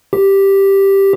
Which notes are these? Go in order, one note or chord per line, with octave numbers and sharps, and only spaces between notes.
G4